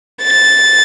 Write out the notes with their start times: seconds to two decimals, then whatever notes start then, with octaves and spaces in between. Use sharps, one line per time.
0.23 A6